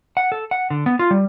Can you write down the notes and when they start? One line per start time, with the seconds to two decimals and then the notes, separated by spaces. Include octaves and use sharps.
0.17 F#5
0.32 A4
0.51 F#5
0.70 D3
0.86 B3
0.99 F4
1.11 G3